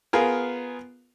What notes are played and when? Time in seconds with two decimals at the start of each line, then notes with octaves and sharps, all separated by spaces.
0.13 B3 F4 G#4 A#4